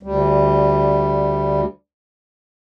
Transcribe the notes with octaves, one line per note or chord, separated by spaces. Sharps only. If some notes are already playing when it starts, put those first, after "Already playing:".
D2 G3